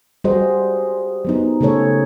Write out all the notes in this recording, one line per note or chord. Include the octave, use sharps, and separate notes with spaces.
G3 F#4 G#4 C5 D#5
F#3 B3 D#4
C#3 A3 G#4 A4 C#5